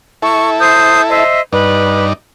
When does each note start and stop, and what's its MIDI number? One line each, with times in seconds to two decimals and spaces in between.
0.22 1.24 64
0.22 1.24 69
0.22 0.49 85
0.59 1.02 72
0.59 1.02 87
0.59 1.02 91
1.08 1.40 72
1.08 1.40 75
1.08 1.40 76
1.53 2.13 43
1.53 2.13 63
1.53 2.05 71
1.53 2.13 74